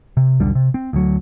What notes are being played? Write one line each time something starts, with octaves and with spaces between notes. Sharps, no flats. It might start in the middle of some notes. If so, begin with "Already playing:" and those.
C3
E1 B1 D3 G3
C3
C4
D2 F#3